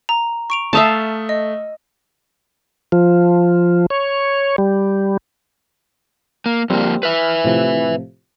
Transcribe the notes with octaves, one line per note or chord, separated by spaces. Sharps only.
A#5
C#6 D7 F7
A3 E5 F5 A5 D#6 E6
D#5
F3
C#5
G3
A#3
F2 G3 A#3 C4
B4 E5 B5 F6
A2 C3 F3